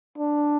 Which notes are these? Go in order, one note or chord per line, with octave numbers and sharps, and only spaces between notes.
D4